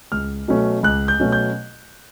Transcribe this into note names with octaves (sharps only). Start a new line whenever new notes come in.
C#2 F6
B2 F#3 A3 C#4
C#2 F#6
G6
B2 F#3 A3 C#4
G6